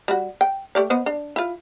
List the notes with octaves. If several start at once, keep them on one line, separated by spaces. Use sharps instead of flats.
G3 F#4
G5
A3 G4 D5
B3 C5 D#5
D4
E4 F4